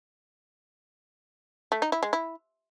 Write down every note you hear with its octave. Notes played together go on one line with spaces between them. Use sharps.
A3
D#4
E4
G#3
E4